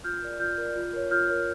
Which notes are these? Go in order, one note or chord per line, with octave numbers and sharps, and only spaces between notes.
F4 F6 G6
A#4 D5
F4 F6 G6
A#4 D5
F4
A#4 C#5
F4 F6 G6
A#4 C#5